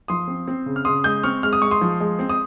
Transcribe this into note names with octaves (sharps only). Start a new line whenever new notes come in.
F3 C6 D#6
C4
C4
C#3
F6
C#3 C6 D#6
G#3 D#6 G6
C4 C#6 F6
G#3 F6
D#6
G#3 C#6
C6 D#6
F3
G#3
C4
D#6